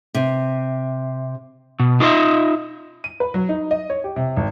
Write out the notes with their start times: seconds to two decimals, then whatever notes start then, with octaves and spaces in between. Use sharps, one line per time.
0.15 C3
1.80 B2
2.00 D#4 F4 A4 C5 D#5 E5
3.04 D#7
3.20 B4
3.34 F#3
3.49 D#4
3.71 D#5
3.90 C#5
4.04 G4
4.16 C3
4.37 G#1